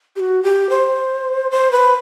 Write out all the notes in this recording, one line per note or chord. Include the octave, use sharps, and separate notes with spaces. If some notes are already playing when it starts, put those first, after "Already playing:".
G4
F#4
G4
C5
C5
B4